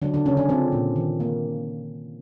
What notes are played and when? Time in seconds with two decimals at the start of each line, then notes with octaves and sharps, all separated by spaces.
0.02 D3 F#3 D4
0.14 D3 D4
0.26 C#3 C#4
0.37 D3 D4
0.49 C3 F3 C4
0.72 A#2
0.96 D#3
1.20 A#3